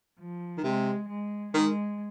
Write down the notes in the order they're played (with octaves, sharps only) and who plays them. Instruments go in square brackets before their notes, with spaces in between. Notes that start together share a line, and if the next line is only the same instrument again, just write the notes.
[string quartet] F3
[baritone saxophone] D#3
[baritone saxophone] C3 [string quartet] G#3
[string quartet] G#3
[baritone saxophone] D#3 [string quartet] G#3